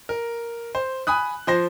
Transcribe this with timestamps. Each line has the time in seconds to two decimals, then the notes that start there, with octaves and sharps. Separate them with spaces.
0.09 A#4
0.75 C5
1.07 G#5 B5 D#6 F#6
1.47 F3 C5 A#6